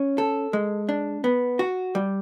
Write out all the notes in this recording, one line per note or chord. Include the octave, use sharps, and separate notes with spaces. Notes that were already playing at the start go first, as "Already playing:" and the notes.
Already playing: C#4
A4
G#3
D4
B3
F#4
G3